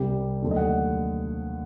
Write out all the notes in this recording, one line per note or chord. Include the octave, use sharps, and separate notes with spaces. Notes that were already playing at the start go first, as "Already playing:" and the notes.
Already playing: C2 C3 G3 G4
D#2 D3 F#3 A3
D#5
F#5